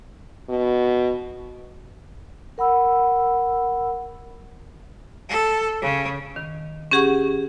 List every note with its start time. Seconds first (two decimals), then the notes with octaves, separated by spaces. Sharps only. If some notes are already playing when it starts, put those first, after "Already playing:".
0.49 B2
2.58 A#4 F#5 B5 E6
5.30 A4
5.82 C#3
6.36 D#3
6.91 C#4 G4 G#4 F#5 C#6